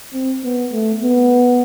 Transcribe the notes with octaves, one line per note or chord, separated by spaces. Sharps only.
C4
B3
A3
B3